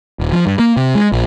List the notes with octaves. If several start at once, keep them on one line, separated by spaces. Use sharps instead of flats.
D#1
F3
G2
A#3
C3
G#3
A#1